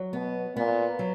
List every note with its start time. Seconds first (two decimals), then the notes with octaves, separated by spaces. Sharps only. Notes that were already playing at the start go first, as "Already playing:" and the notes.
Already playing: F#3
0.13 B2 B3
0.56 A#2 B3
0.99 F#3